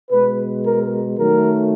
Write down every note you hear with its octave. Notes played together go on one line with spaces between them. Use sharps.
B2 G#3 B4
A#4
D#3 F#3 A3 A#4